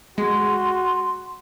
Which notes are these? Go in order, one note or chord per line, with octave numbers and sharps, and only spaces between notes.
G#3 F#4 C6